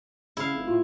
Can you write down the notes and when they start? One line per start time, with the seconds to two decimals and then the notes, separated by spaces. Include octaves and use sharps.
0.37 C#3 E4 F5
0.54 F1
0.68 A2 F4